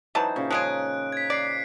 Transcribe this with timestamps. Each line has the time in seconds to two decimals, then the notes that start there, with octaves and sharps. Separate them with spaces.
0.15 E3 F#3 D#4 C5 A5
0.36 A#2 C#3
0.51 F3 G#3 G#4 F#6 D7
1.12 G#6 B6
1.30 D5 C7 D7